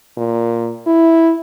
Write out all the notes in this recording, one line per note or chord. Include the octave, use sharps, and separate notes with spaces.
A#2
E4